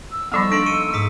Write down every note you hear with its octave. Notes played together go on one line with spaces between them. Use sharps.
E6
F3 G3 B3 D#4 A4 C#6 E6
A#3 D4 D#4 A4 C6 D7
C#6 C#7 D#7
G#2 D#6 B6 C#7